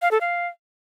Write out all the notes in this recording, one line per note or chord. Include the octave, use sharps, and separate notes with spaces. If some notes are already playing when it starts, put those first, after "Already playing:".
F5
A4
F5